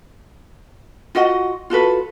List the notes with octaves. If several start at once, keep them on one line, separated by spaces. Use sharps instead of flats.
F4 F#4 D#5 F#5
F4 F#4 A4 B4